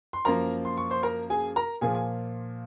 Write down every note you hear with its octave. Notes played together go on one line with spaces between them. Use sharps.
C6
F#2 F3 A#3 A#4 A#5
C6
C#6
C5 C6
A#4 A#5
G#4 G#5
A#4 A#5
A#2 F3 A#3 G#4 G#5
G#5